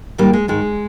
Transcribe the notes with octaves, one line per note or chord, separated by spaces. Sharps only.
G#2 D#3 G3 A#3
G#3
G#2 D#3 G#3